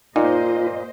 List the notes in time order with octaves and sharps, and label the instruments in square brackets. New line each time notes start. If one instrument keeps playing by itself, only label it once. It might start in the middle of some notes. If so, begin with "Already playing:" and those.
[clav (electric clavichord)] A#2 [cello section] A#3 C5 D#5 [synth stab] D#4 [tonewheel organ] F4